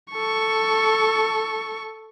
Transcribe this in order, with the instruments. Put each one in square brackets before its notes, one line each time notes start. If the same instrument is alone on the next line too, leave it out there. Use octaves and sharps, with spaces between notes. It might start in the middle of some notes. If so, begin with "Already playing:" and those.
[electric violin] A4 C#6